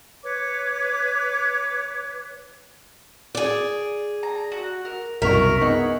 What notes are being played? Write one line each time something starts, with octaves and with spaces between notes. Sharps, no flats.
B4 C#5 D6
G#4 D5
A#5
F#4
A#4
C2 F#2 B2 A#4 E5 A#5 C#6
B3 D#4 G#4 E5 F#5